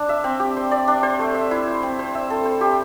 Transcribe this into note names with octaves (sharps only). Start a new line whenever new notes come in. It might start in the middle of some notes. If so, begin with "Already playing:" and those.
Already playing: D4
E5
C4
G4
C5
D5
D4
C5
A3
E5
E4
C5
C4
C5
E5
A4
C5
G4